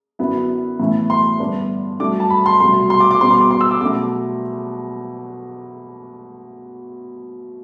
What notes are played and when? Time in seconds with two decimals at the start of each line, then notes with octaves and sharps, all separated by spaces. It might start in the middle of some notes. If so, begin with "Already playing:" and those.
0.19 F#2 D3 F#3 B3 E4
0.80 A2 E3 B3 E4
1.10 C6
1.40 G2 D3 G3 B3 D4
2.00 G2 F#3 A3 D4 D6
2.20 A5
2.30 B5
2.46 C6
2.60 C2 B2 F#3 A3 C6
2.90 C6
3.00 D6
3.11 D6
3.21 B2 G3 B3 C6
3.31 C6
3.41 D6
3.51 C6
3.61 E6
3.71 D6
3.81 B2 F#3 A3 D4 D6